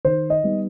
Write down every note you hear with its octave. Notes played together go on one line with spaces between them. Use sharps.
D#3 C5
D#5
G3 B3 D#4